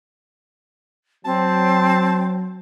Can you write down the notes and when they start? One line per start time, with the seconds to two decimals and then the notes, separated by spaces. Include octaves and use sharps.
1.25 F#3 C4 A5